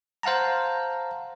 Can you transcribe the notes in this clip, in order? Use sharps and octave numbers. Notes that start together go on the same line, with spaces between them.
C5 F5 F#5 A5 A#5